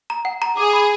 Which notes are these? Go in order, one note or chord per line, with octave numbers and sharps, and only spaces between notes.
A#5
F#5
A#5
G#4 D6
B5